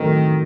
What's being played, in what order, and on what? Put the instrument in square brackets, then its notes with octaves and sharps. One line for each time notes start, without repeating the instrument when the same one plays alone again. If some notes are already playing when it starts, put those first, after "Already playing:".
Already playing: [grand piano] A2 F#3 C4 D#4 A4 [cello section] D#3